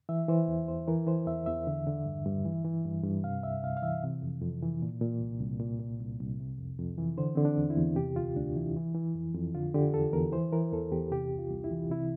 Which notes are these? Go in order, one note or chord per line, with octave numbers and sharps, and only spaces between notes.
E3 E5
E3 C5
E2
E2 C5
E3 A#4
E3 C5
E2 E5
E2 E5
D3
D3
G2
G2
E3
E3
G2
G2
C3 F5
C2 E5
C2 F5
F5
E3 E5
C3
F2
F2
E3
A#2
A#2
C2
C2
A#2
A#2
C2
C2
C3
F2
F2
E3
D3 C5
D3 C4
D4
E2
E4
E2
C3 G4
D2 F4
D2 D4
E3 E4
E3
E3
F2
F2
D3 F4
D3 G4
E2 A4
E2 A#4
E3 C5
E3 A#4
E2 A4
E2 G4
C3 G4
C2
F4
C2
E4
E3
C3 E4